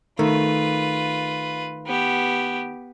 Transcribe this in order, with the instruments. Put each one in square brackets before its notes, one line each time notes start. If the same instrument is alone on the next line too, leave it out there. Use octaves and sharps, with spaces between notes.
[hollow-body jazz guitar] D#3 A3 [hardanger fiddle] F4 B4
[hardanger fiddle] B3 G4